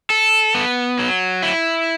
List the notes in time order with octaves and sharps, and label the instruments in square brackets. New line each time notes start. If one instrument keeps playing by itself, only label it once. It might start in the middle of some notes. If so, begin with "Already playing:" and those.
[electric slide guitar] A4
B3
F#3
E4